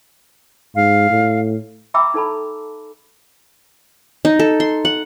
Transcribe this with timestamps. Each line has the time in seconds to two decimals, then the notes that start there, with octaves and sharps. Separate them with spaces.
0.75 G#2 F5
1.10 A2
1.94 E5 G5 A#5 B5 D6 E6
2.14 D#4 A4 A5 B5
4.25 D#4
4.39 A4
4.60 C6
4.85 F#5